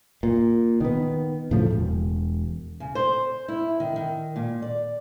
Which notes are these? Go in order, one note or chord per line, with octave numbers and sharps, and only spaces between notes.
A#2
D#3 B3
A2 C#3 F3 A3
E1
C#3
C5
E4
D#3
D#3
A#2
D5